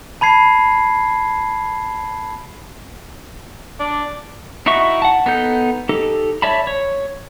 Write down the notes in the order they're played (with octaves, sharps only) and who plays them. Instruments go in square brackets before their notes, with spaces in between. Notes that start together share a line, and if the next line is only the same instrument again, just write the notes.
[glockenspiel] A5 B5 G#6 C7
[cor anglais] D4
[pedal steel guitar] D#4 E4 F#4 E5 C#6
F#5 A5
B3 D#4 A4 G6
D#4 G4 A4
C#5 D5 E5 A5 B5
C#5